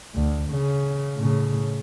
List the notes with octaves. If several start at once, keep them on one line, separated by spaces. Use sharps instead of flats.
D2
C#3
A2 C#3